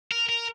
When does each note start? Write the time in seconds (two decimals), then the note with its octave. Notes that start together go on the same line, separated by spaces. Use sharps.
0.12 A#4
0.29 A#4